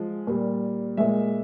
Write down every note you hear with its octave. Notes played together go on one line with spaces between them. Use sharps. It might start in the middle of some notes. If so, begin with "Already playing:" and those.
Already playing: F3 G#3
A#2 G3
A#2 G#3 E5